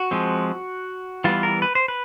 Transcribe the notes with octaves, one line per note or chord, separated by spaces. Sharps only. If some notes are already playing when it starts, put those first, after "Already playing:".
Already playing: F#4
F3 G#3 C4
E3 G3 B3 F4
A#4
B4
C5
B4